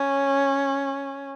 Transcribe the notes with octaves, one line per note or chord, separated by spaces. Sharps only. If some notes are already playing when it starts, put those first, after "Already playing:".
Already playing: C#4